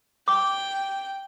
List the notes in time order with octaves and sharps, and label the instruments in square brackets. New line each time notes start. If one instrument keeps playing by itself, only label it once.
[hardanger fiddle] G5 [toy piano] D6